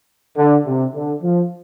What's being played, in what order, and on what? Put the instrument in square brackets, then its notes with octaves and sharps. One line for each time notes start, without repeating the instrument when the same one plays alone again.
[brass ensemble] D3
C3
D3
F3